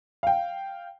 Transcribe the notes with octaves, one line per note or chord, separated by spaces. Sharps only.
F5 G5